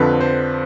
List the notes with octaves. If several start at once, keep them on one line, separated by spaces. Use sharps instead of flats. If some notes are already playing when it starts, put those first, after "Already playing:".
Already playing: F2 D3 F3 C4 B4
C5